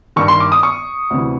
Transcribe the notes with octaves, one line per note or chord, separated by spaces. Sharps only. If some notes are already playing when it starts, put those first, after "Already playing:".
G2 D#3 C#6
C6
D6
D#6
C#6
D2 C3 E3